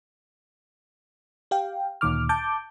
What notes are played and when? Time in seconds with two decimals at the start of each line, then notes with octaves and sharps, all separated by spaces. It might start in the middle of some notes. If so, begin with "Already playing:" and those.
1.51 G4 F5 G5
2.01 D2 A#2 D#3 D6 F6
2.29 A5 D6 G6